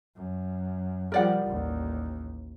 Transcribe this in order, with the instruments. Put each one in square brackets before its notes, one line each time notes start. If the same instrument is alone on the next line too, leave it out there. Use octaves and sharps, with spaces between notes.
[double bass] F#2
[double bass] F3 G3 [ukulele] A#4 D5 F#5
[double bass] A1 D#2